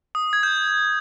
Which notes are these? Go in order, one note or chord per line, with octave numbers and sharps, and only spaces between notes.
D#6
G#6
G6